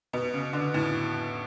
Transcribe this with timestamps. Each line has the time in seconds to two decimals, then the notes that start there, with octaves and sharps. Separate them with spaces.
0.13 B2
0.34 C#3
0.53 D3
0.74 A2